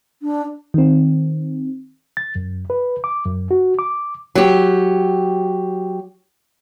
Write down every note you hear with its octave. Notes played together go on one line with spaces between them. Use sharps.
D4
D#3 C4
A6
F#2
B4
D6
F#2
F#4
D6
F#3 G4